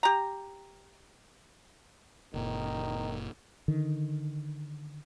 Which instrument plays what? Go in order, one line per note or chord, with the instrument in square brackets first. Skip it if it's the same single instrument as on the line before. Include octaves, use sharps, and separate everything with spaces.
[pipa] G4 A#5
[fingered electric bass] F#1 A#2 [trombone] D#3
[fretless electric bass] D3 D#3